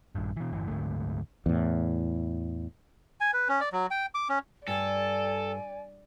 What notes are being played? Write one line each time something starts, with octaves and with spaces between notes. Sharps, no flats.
A#1 G2
B2 E3
G1 E3
D2 G#2 D3 A3
E2 A2
G#5
B4
C#4
D5
F#3
G5
D6
C#4
G2 A4 D5 G#5